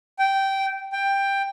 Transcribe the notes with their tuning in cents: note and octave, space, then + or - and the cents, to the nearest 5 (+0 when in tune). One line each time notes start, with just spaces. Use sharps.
G5 -10
G5 +10